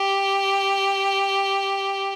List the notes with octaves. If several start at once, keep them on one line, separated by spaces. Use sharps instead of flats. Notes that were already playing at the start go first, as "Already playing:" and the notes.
Already playing: G4